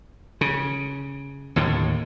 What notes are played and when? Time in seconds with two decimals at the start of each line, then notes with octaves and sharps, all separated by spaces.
0.41 C#3
1.56 D#2 A2 D3